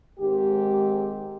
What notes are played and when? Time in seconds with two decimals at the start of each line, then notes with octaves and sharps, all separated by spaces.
0.18 G#2 D#3 G#3 C4 G4